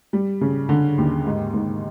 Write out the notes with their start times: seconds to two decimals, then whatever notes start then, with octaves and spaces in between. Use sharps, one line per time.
0.13 G3
0.41 C#3
0.69 D3
0.98 D#2
1.26 G#2
1.54 G#2